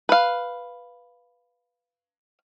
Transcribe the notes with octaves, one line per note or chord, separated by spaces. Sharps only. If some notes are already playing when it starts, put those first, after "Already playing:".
B4 F5